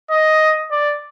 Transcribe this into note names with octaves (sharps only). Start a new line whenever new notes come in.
D#5
D5